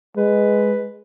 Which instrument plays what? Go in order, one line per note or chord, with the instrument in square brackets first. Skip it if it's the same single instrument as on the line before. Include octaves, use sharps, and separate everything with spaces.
[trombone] G#3 [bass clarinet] B4